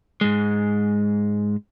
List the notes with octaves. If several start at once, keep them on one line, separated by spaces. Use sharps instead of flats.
G#2 G#3